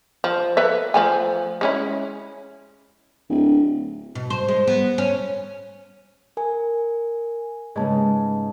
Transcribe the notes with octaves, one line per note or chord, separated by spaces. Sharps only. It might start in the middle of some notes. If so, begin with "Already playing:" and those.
F3
A4 B4 E5
F3 A3 G#5
G#3 C#4 E4
D1
B2
C5
G#3
B3
C#4
A#4 G#5
G#2 C#3 G#3 A#3 B4 A5